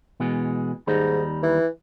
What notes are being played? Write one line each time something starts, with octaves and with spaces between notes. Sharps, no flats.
B2 E3 G#3
D#2 G#2 G3 D#4
E3